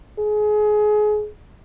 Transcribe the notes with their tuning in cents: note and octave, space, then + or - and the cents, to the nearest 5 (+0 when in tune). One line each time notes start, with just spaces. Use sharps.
G#4 +25